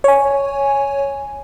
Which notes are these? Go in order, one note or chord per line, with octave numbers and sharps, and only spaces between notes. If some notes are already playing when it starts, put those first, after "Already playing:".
C#5 G#5